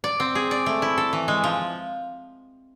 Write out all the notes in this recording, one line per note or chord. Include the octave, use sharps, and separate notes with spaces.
D5
C4
G#4
D5
A3
E4
A4
E3
G#3
F3